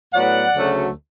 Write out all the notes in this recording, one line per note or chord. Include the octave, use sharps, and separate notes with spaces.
A2 F#3 B3 D5 F#5
D2 C#3 F#3 A3